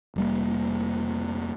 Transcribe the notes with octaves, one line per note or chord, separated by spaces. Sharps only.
F1 G3 A#3